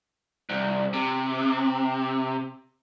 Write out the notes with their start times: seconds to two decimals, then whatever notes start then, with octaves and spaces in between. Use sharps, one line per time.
0.50 C2
0.94 C3